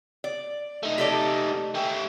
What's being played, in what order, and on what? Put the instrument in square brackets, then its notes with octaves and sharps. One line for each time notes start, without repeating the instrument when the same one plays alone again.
[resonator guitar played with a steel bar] D5
[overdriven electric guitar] A3 D#4
[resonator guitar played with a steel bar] G4 A4 D5
[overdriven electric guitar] A3 G4